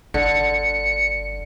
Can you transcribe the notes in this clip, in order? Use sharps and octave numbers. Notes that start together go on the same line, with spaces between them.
G1 D3 C#7